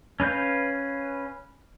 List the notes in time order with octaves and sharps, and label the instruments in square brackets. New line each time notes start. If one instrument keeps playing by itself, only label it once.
[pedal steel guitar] C#4 B4 F5 G6